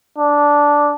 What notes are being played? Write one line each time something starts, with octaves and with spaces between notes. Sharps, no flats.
D4